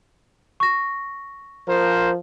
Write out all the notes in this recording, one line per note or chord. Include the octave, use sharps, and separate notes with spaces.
C#6 A#6
F3 A#4 C5